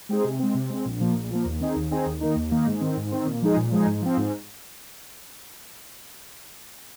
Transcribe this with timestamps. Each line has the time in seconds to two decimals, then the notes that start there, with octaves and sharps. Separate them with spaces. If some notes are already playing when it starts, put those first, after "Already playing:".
0.09 G#3 C4 D#4 G#4
0.24 C3
0.39 G#3 C4
0.55 C3
0.70 G#3 C4
0.85 A#1
1.00 A#2 F3 A#3
1.15 A#1
1.30 A#2 F3 A#3
1.45 D#2
1.60 D#3 C4 D#4 G#4
1.76 D#2
1.91 D#3 C4 D#4 G#4
2.06 D#2
2.21 D#3 A#3 D#4
2.36 D#2
2.51 D#3 A#3 D#4
2.66 G#2
2.81 D#3 C4
2.97 G#2
3.12 D#3 C4
3.26 A#2
3.42 F3 G#3 D#4 G#4
3.57 A#2
3.72 F3 G#3 D#4 G#4
3.86 G#2
4.02 F3 C4
4.17 G#2